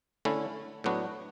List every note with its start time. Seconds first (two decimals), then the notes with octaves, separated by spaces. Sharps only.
0.25 D3 A3 C#4 E4
0.84 A2 F#3 B3 D4 F#4